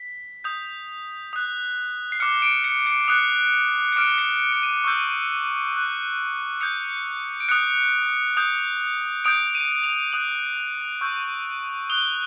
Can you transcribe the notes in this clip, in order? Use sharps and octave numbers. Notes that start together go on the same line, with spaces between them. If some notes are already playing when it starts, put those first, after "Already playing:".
Already playing: B6
D#6 G6
D#6 F#6
C7
D6 F6 C#7
D7
C#7
C#7
D#6 F#6
C#7
D6 F6 D7
C#7
D7
D#7
C#6 E6 G6
D6 F#6
D#6 G6 C#7
D7
D#6 F#6 C#7
D#6 G6
D#6 G6 D7
D#7
F7
D#6 F#6 F#7
C#6 E6 G6
D#6 F#6 G7